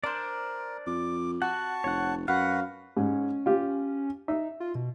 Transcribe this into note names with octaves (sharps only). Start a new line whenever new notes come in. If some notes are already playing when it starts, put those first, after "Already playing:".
D4 A#4 C5 D5
F2 D6
F#4 F#5 A5 C#6
F1 C#5 F#5
F#2 F#4 B4 F5 F#5
G#2 C#4
F4 G4
D#4 E5
F4
B2